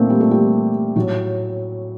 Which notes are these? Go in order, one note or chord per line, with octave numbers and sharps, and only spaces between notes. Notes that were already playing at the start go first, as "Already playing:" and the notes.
Already playing: A#2 A3 A#3 C4 D4
G3
A3
G3
A2 F#3